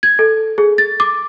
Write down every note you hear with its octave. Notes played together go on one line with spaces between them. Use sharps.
G#6
A4
G#4
A6
D6